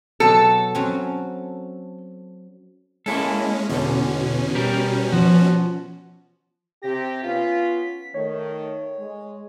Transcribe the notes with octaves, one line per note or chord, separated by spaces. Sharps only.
B2 F#3 A4
F#3 C4 C#4
G#3 A#3 C#4 E4 A4
E2 B2 D3 C#4
G3 G4 A#4
F3 F#4
C3 G4 A#6
B3 C#4 F4 B6
D#3 A3 C#5
G#3